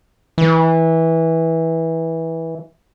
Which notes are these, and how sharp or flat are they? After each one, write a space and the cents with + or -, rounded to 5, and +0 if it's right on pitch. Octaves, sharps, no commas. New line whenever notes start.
E3 -15